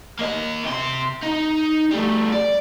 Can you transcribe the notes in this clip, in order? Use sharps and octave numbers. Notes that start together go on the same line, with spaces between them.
A#3 D#5
C3 C6
D#4
G3 A3
D5